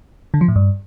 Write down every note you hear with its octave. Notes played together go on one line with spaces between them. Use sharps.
D3
F3
A2
G2